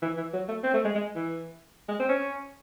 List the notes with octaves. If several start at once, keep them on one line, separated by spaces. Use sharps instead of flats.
E3
E3
F#3
A3
C4
A3
G#3
G#3
E3
G#3
C4
C#4